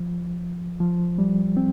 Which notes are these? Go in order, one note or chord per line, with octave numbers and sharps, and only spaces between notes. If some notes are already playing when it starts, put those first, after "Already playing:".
Already playing: F3
F3
G3
C4